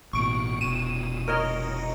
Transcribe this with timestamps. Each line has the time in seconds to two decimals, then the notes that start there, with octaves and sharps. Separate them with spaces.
0.13 A1 B2 C#6 D7
0.61 F1 B2 D#7 E7
1.28 A#4 C#5 D#5